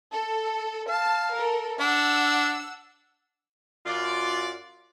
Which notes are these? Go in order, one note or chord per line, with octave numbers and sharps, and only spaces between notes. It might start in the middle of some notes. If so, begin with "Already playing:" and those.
A4
F5 A5
A4 A#4
D4 F#5 E6
F#2 F4 D5